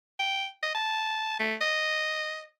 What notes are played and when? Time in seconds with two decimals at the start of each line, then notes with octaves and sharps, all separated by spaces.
0.19 G5
0.63 D#5
0.75 A5
1.39 A3
1.61 D#5